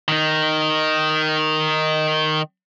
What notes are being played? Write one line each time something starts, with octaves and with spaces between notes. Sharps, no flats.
D#3 D#4